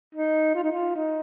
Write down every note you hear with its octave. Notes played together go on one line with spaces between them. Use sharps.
D#4
F4
D#4
F4
D#4